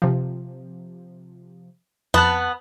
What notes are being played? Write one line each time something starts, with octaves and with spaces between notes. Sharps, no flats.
C3 F3
F2 B3 A5 F#6